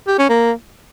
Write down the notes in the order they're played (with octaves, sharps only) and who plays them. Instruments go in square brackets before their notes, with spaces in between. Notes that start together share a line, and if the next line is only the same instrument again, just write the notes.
[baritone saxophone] G4
C#4
A#3